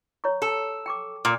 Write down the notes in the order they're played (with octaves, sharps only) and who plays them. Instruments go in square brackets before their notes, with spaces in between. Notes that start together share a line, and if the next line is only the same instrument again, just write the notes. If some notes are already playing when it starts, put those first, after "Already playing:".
[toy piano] C#5 A#5 C#6
[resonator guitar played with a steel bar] A4
[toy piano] G5 C#6 D6
[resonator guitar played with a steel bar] A#2 [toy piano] D6